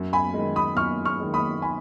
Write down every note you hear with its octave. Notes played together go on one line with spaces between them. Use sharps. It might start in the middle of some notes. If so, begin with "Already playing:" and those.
Already playing: F#2
G#5 B5
D#3 G#3
B5 D#6
F#2 C#6 F6
C#6 F6
D#3 G#3
B5 D#6
G#5 B5